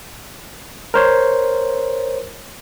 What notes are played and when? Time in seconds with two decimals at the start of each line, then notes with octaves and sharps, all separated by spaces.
0.94 A#4 C5 C#5